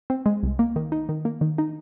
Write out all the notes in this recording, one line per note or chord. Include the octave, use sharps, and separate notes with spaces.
C4
G#3
C2
A#3
D#3
D#4
D#3
A#3
D#3
D#4